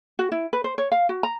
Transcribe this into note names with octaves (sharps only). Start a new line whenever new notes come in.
F#4
E4
B4
C5
C#5
F5
F#4
A#5